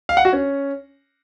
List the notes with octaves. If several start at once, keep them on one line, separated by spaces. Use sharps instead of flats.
F5
F#5
F#4
C#4